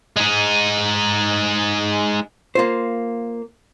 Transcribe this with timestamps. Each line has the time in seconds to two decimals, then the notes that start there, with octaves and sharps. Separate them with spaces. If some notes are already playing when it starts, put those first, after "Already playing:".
0.16 G#3 D#4
2.55 A#3 F4 C5